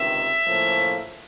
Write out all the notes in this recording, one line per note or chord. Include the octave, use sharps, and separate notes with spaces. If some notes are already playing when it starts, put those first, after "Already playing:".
Already playing: C#2 C3 D#3 E5
A2 F3 A#3 C#4